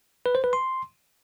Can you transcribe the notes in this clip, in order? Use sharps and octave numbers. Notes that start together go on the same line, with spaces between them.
B4
C5
B4
C6